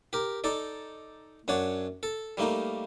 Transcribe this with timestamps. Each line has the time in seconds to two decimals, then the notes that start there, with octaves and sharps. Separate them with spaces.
0.13 G4 A#4
0.44 D#4 A4 D5
1.48 F#2 D4 C#5 F#5
2.03 A4
2.37 G3 A3 A#3 D#4